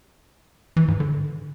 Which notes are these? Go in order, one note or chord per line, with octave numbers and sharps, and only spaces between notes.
E3
G#2
D3